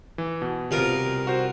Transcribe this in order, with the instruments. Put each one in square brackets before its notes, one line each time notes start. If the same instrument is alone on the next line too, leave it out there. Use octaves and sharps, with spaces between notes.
[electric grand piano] E3
B2
[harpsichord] C2 F4 A#4
[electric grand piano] F#4 C5